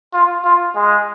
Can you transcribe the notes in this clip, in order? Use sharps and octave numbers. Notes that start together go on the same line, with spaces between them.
F4
F4
G#3